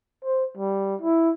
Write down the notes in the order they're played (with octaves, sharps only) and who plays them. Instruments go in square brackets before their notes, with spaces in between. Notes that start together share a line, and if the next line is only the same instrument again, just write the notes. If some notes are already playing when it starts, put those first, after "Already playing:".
[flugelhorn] C5
G3
E4